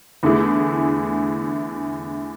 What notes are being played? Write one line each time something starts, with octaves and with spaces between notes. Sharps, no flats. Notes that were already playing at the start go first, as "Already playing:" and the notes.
E2 D3 A3 E4 G#4